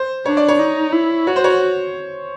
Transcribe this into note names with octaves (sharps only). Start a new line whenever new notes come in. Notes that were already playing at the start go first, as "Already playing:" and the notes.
Already playing: C5
D4 C#5
D5
C#5
D#4
E4
F#4 C#5
C5
C#5